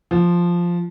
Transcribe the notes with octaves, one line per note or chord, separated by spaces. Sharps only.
F3